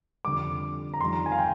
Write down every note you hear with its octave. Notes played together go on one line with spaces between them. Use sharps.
F2 D3 G3 D6
A#5
F2 D#3 G3 C6
A#5
G#5
F5
G5